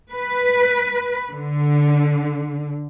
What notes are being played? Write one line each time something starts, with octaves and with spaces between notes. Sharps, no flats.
B4
D3